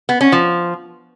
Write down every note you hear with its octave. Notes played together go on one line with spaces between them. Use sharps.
B3
C#4
F3